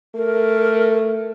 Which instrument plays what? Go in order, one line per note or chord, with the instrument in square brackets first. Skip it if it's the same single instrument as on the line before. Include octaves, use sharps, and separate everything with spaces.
[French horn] A3 [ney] A#4